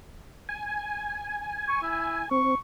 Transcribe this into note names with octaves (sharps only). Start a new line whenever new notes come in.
G#5
C#6
E4
C4 C#6